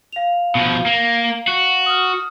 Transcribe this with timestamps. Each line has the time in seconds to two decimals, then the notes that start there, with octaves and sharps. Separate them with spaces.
0.13 F5 F7
0.55 B2 F3
0.86 A#3
1.48 F#4
1.86 D#6 F6